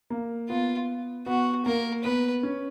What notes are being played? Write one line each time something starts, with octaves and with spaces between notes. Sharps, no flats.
A#3
B3 F4
B3 F#4
A#3 A#4
B3 B4
C#4